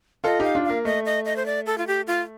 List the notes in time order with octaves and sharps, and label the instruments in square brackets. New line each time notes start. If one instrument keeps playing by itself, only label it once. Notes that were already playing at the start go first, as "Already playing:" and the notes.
[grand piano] F4 A4 [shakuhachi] D#5
[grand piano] D#4 G4 [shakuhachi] F5
[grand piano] D4 F4
[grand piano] A#3 [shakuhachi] F5
[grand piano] A3 [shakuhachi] D#5
[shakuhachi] D#5
D#5
C5
D5
A4
F4
G4
F4